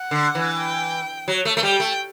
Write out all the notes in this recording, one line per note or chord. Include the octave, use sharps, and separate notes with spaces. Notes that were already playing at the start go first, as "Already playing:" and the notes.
Already playing: F#5
D3
E3
G5
F#3
A3
A3
G3 G5
A3